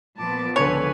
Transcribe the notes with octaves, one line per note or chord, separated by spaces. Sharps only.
A#2 F3 B3 A5 D6
C#2 D3 B4 C#5 G#5